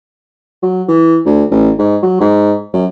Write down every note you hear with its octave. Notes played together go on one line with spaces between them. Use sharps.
F#3
E3
D2
A1
G#2
F#3
G#2
F#2